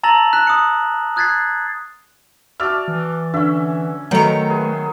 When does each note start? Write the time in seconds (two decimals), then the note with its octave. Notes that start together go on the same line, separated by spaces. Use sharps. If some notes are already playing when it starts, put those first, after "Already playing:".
0.03 A5 A#5 E6 A6 A#6 F#7
0.33 F#6 B6 E7
0.47 D#6 C#7
1.16 D#6 F#6 G#6 A6 B6 C7
2.60 F#4 D5 E5 A5 F6
2.88 E3
3.34 D3 C#4 E5
4.11 D#3 F#3 A3 B3 A4 A#5 C#7
4.50 G#4 B4